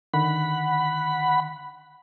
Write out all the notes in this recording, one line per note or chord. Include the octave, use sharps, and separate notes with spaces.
D3 D#3 F#5 B5